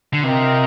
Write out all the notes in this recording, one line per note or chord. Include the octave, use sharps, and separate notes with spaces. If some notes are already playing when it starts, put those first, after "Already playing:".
D3
C3 F4 A#4 D#5 G5